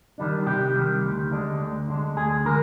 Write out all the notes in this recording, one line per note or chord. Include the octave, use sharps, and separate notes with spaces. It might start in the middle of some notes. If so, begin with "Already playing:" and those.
D#3 G3 D4
C3 G4
D#3 G3 D4
D2
D3 G#3 D4
D2
D3 G#3 D4
D2 G#4
D3 G#3 A#4